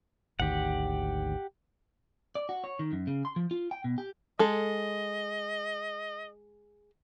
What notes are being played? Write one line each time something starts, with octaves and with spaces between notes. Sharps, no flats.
G#1 D2 D#3 G4 F#5
D5
F#4
C#5
D#3
F#2
C#3
C6
F3
F4
G5
B2
G4
G#3 A4 D#5